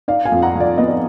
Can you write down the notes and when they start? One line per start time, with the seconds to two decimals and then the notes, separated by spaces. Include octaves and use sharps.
0.08 D#4 D5 F5
0.25 F5 G#5
0.32 F2
0.42 F#5 A#5
0.55 F3
0.60 D5
0.78 B3 D#5
0.88 D5